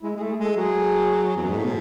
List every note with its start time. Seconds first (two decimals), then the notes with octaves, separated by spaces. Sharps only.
0.02 G#3 E4
0.16 G#3 G#4
0.21 A3
0.29 G#4
0.38 G#3 A4
0.56 F#3 G#4
1.36 E2
1.43 F#2
1.50 G#2
1.57 A2
1.64 B2